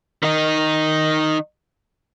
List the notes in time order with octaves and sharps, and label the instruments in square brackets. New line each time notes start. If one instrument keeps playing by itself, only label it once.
[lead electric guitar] D#3 D#4